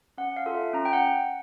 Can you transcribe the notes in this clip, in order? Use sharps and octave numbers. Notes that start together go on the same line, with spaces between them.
C#4 F#5
F5
F4 A4
E5
C#4 A#5
G5
F#5